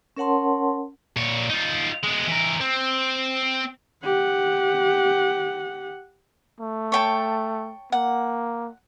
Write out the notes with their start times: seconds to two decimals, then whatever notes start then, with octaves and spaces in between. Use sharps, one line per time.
0.17 C#4 A#4 C#5 F#5 A5 C6
1.17 A#2 C#5
1.50 D#4 F4
2.03 G#3 B3
2.27 E3 A#4
2.60 C4
4.03 G4 F#5
6.60 A3
6.92 C#5 G5 A5
7.92 A#3 F#5